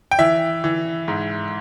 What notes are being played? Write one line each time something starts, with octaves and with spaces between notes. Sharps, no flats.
G5
E3 E5
E3
G#2